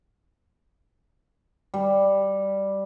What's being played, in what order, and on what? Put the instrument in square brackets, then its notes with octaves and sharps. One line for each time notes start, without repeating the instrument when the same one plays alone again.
[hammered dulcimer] G3